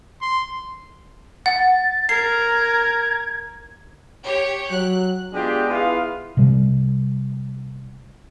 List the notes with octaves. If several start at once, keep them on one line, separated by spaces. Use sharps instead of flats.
C6
F#5 A6
A#4 G#6 C7
G4 C#5
F#3 F#6
G#3 B3 D4 F4 G4
B3 E4 F4 G#4 B4 F5
C3 G3